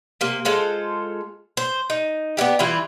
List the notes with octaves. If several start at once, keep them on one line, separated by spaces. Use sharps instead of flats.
C3 A#3
G#3 F4 A4 C5
C5
D#4
B3 D4 E4 G4
E3 G3 E4 F4